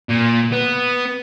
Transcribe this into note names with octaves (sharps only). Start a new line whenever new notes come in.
A#2
B3